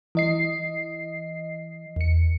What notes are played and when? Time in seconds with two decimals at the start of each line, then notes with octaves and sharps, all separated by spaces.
0.15 E3 D#5 C7
1.96 E2 C#7